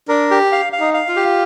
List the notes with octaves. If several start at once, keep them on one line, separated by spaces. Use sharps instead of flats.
D4 A#4
G4
F5
F5
D#4
F5
F4
G4